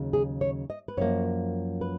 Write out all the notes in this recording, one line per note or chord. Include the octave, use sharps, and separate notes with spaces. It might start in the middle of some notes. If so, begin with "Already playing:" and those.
Already playing: D#2 C#3 F#3
G#4
C#5
D#5
B4
F#2 F3 A#3 C#5
B4